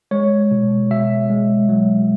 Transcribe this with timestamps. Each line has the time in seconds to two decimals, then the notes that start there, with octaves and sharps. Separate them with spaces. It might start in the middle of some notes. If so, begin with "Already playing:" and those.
0.11 G#3 C#5
0.51 B2
0.90 B2 E5
1.29 G#3
1.69 F#3